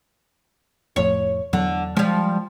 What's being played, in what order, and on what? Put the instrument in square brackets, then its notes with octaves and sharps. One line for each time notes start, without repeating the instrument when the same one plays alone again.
[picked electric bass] F1 F2 A2 [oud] C#5
[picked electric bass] E2 F#3 [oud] D3
[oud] F3 G3 [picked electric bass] G#3